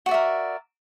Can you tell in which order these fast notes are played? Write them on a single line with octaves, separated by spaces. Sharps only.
F#4 D5 E5 A#4